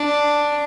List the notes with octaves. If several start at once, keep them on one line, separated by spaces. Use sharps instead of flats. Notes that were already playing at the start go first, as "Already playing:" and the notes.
Already playing: D4